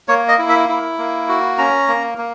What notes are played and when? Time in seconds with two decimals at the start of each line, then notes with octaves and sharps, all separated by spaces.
0.08 A#3 C#5
0.28 D#5
0.38 E4
0.49 E5
0.68 E4
0.98 A#3
1.28 F#4
1.58 C#4 A#5
1.88 A#3
2.18 A#3